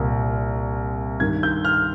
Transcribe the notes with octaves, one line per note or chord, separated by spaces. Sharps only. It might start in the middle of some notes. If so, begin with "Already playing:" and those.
Already playing: C2 A#2
G2 D#3 G#6
G6
F6